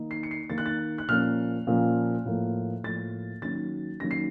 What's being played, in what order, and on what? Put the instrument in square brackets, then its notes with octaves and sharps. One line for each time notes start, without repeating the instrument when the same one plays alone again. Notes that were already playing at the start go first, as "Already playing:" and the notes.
Already playing: [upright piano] D#3 A#3 D#4
C7
C#7
C7
D#3 A#3 D#4 A6
F#6
A6
F#6
A#2 F3 A#3 C#4 F6
A#2 F3 A#3 C#4
A2 F3 A#3
A2 F3 A#3 A6
D#3 F#3 A#3 C#4 A6
D#3 F#3 A#3 C#4 A#6
C7